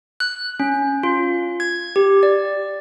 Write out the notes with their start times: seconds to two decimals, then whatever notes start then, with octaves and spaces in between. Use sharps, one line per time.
0.20 F#6
0.60 C#4
1.03 F4
1.60 G#6
1.96 G4
2.23 D5